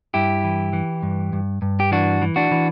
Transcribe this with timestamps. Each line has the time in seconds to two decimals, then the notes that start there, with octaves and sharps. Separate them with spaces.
0.14 G2 E4 G4
0.44 E3
0.73 E3
1.03 G2
1.33 G2
1.62 G2
1.80 G4
1.92 E3 D4 F#4
2.22 E3
2.36 D4 F#4
2.51 E3